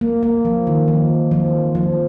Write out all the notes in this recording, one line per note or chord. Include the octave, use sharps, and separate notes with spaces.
A#3
A#3
F3
D#3
F3
F3
F3